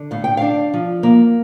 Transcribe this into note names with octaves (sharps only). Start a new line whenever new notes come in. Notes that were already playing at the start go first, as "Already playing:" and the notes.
Already playing: D3
A2 F5
G5
D4 F5
F3
A#3